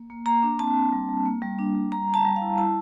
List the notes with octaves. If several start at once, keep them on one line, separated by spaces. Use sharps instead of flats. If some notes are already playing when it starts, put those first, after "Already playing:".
Already playing: A#3
A#3
A#3 A#5
D4
C4 A5
C4
G3
G3
A#3
G3
D4
G3
G3 A#5
G3
A5
G3
F5
E4
E4 A5